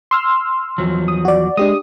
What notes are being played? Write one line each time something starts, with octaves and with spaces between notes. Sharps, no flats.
C6 E6 F6
E2 F3 F#3
D#6
F#4 D5
G#3 D4 G4 D#6